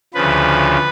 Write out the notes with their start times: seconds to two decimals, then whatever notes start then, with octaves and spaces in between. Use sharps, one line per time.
0.14 D2 C#3 F3 B4